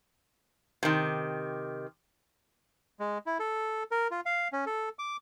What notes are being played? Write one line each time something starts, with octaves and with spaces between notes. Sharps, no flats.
C3 D#3
G#3
E4
A4
A#4
F4
F5
C#4
A4
D6